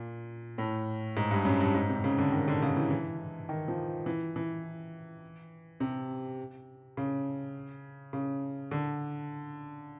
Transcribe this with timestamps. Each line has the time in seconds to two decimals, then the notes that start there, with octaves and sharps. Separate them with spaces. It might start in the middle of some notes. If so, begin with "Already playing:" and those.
Already playing: A#2
0.58 A2
1.17 G#2
1.31 G2
1.45 F#2
1.60 G2
1.74 G#2
1.89 C3
2.04 C#3
2.19 D3
2.32 D#3
2.48 D3
2.62 C#3
2.76 E3
2.90 E3
3.49 D#3
3.68 F3
4.06 E3
4.36 E3
5.80 C3
6.97 C#3
8.13 C#3
8.71 D3